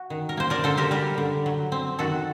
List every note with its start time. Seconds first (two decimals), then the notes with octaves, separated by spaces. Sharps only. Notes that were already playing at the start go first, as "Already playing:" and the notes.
Already playing: F#4
0.10 D#3
0.29 A#4
0.37 A#3 C5
0.50 A#4 D5
0.64 D3 A4 C5
0.77 G4 A#4
0.91 G3 G4 A#4
1.18 D3
1.46 F#3
1.72 C4
1.99 D#3 F#4 A4